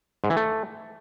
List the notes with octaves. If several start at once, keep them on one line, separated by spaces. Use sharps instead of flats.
G#2
E3
A3